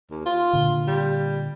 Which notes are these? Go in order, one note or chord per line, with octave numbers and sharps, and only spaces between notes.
D#2
F4
A#2 D3
G3